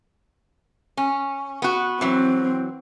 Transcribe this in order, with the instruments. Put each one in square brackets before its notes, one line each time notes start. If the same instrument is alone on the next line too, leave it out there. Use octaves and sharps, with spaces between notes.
[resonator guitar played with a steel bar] C#4
B3 F#4
[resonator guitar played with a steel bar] E3 F#3 [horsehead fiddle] C4